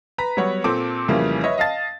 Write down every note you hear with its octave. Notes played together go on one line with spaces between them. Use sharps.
B4 A#5 B6
F#3 G3 B3 B4 C#5 F#5
A#2 C4 A4 D6
F2 C#3 E3 G3 A3 A#3
B4 C#5 D#5 E5
D#5 F5 A5 A6